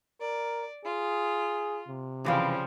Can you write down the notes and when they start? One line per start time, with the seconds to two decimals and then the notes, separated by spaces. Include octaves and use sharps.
0.20 A#4 D5
0.84 F4 G#4
1.88 C3
2.24 F#2 C#3 E3 F3 G3 F5